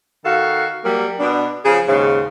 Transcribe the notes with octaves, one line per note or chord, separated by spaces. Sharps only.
D#3 F#4 A4 F5
F#3 G3 A#3
B2 D4
C#3 F3 C#4 G#4
D#2 G#2 C#3